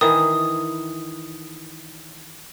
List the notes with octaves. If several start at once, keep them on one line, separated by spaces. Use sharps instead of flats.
D#3 E3 D#6